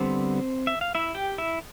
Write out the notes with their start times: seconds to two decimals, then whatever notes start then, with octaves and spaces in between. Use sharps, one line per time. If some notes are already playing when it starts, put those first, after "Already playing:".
Already playing: D3 G3 B3 C4 C5
0.67 E5
0.81 F5
0.95 E4 E5
1.15 G4 G5
1.38 E4 E5